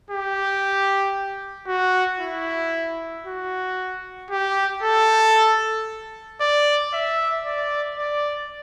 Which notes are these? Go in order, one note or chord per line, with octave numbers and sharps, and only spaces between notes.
G4
F#4
E4
F#4
G4
A4
D5
E5
D5
D5